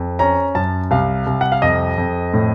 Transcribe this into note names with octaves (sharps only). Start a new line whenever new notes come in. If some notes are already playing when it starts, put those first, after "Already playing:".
Already playing: F2
C#4 A#5
F#2 A5
C2 F5
C2
F#5
F5
F2 D#5
F2
A2